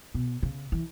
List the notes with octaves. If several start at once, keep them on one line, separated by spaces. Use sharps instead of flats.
B2
C#3
E3